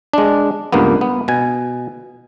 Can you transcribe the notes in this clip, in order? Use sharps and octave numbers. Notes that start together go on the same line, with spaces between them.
G#3 D4
C#2 G2 A#3 B3
B3
B2 G#5